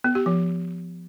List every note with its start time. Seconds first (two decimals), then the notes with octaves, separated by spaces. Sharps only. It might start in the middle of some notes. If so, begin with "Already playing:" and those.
0.04 B3
0.15 G4
0.26 F3